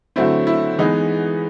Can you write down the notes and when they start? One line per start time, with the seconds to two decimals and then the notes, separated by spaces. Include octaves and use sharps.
0.16 D3 F#3 A3 C4 E4
0.47 E4
0.78 E3 G#3 B3 D#4